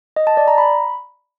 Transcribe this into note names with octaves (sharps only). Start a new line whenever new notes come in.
D#5
A5
D5
A#5
B5